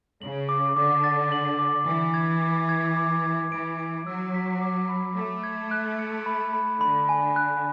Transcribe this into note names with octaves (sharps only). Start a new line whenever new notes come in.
C#3 F#7
D6
D3 D6
A6
F#7
D6
E3 D6
G#6
D6
G#6
D6
G#6
E3 D7
D7
F#3 E6
B6
D6
B5
A3 D6
G#6
F#6
C#7
B5
B5
D3 B5
G#5
F#6